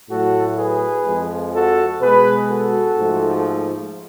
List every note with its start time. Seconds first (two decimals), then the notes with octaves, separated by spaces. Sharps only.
0.10 A2 F#3 A3 F#4 A4
0.58 G#4 B4
1.06 F2 F3 G#3
1.54 F#4 A4
2.01 B2 G#3 G#4 B4
2.50 F#4 A4
2.98 G#2 F3 A3